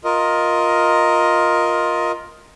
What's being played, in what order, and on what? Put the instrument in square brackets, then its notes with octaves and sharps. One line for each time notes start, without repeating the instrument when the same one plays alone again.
[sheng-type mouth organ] F4 A#4 D#5